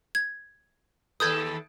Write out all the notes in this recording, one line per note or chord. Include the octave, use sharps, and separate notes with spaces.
G#6
D#2 A4 B4 D#6 G6 G#6